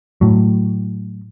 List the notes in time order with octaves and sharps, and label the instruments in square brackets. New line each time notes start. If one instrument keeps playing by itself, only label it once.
[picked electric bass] A2 F#3